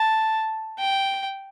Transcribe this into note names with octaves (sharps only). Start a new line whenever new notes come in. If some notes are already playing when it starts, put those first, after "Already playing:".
Already playing: A5
G5